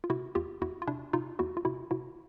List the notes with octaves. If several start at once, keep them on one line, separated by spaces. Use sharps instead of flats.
F4
C3 E4 F#4
E2 F4 G4
E2 E4 F#4
F4
C3 D4 E4
C3 D#4 F4
E2 E4 F#4
F4
C3 E4 F#4
C3 E4 F#4